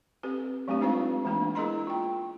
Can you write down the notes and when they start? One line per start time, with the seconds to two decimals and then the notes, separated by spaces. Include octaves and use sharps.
0.23 C4 G4 A4 B4
0.68 F#3 A3 C4 D4 G4
0.81 G#3 C4 D#4 F4 B4 F5
1.25 E3 G#3 A#3 B3 D4
1.55 E4 G#4 A#4 D#5 A#5 C6
1.87 F4 G5